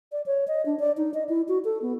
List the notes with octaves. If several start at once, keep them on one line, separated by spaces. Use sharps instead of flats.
D5
C#5
D#5
D4
D5
D#4
D#5
E4
F#4
A4
B3